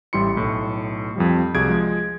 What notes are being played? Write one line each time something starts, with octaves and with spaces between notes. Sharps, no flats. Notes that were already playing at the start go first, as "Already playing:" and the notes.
A1 G3 E4 C6 C#7
B1 A2
F2 F3 G3
C2 F#4 G#4 G#6 D7
F3 G#3